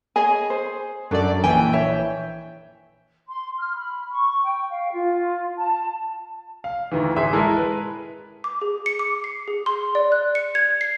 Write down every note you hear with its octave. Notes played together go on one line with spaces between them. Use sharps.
G#4 C#5 D#5 G#5
C5
F#2 F#3 D4 A4 D5
A#1 E3 G5 G#5
C#5 E5
C6
F6
B5
C#6
G5
F5
F4
A5
F5
D2 D#3 E3
A1 G#4 E5 C6
G#3 E4 A4 A#4
B4
D6
G#4
C#7
D6
C7
G#4
C6
D5
F#6
C#7
G#6
C7